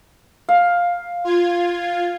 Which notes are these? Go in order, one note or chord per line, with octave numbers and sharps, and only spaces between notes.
F5
F4 G#6